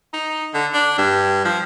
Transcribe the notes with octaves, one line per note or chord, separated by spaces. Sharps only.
D#4
D3
D4
G2
F3